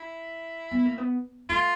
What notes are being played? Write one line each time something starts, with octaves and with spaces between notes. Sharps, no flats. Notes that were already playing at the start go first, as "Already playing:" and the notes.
Already playing: E4
B3
A#3
B3
A3 F4